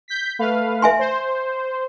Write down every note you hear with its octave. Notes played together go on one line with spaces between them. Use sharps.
G6 B6
A3 B4 F5
E5 G#5 C6
C5